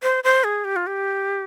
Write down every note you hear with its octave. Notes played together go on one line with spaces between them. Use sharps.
C5
C5
G#4
G4
F4
G4